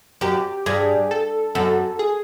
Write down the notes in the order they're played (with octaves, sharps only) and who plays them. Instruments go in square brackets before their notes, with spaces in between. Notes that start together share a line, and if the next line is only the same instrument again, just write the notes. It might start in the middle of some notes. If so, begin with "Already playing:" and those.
[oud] F#2 [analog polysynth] G4
[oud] G2 [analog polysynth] G#4
[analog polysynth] A4
[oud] F#2 [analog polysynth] A4
[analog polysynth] G#4